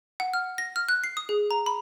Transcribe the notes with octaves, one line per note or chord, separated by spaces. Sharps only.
F#5
F6
A#6
F6
F#6
C7
D#6
G#4
A#5
B5